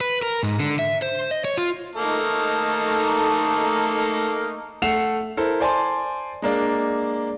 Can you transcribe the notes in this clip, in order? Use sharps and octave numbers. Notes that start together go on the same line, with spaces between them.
B4
A#4
G#2
D3
E5
C5
D#5
C#5
F4
A3 A#3 D#4 A4 A#5
A3 F#5 C7 E7 F7
E4 A4 A#4 C5
C5 D5 G#5 A5 C6
G#3 A#3 D4